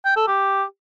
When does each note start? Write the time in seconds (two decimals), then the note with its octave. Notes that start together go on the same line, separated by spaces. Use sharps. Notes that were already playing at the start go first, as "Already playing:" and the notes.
0.05 G5
0.17 A4
0.28 G4